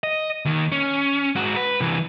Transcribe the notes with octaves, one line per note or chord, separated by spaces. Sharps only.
D#5
D#2 D#3
C#4
G#2 F#4
B4
C3 E3